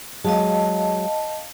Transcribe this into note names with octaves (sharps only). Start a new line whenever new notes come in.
F#3 G#3 D#5 F5 A5